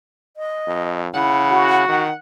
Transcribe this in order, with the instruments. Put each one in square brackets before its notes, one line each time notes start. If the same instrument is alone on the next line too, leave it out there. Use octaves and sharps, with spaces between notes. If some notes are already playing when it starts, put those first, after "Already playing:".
[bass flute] D#5
[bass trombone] F2
[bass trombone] C#3 [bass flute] E4 [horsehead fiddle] F#5
[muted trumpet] F#4
[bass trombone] D#3 [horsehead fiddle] F#5